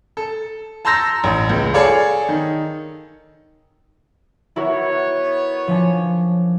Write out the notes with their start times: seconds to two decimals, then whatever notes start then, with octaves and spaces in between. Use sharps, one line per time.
0.17 A4
0.85 A5 A#5 C6 E6 G6 A#6
1.24 A1
1.49 C#2
1.73 G#4 A4 C#5 D5 F5
2.29 D#3
4.56 B3 E4 F#4 A#4 C#5
5.68 F3 C#4 D4